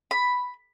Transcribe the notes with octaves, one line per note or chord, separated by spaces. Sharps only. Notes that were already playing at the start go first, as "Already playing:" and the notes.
B5